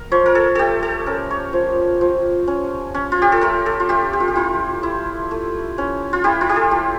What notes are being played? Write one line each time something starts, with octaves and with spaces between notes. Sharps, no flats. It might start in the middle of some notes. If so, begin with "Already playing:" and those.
Already playing: A#4
F3 C#5
A#4
A4
A3 G4 A4
A4
C#4 A#4
C#5
F3
F3
C#4
C#4
F4
G4
A4
A3 A#4
A4
F4
A3 G4
G4
F4
G4
E4 F4
E4
A3
C#4
F4
E4 G4
F4
G4
A4
A3